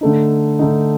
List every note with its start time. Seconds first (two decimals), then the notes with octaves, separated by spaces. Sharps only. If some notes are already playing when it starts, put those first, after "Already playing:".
0.01 D3 A3 D#4
0.59 D3 A3 D#4